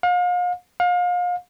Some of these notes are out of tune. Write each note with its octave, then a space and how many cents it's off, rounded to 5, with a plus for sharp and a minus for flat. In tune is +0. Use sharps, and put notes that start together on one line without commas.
F5 +40
F5 +35